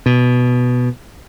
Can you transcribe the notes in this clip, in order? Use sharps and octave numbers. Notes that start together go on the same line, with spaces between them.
B2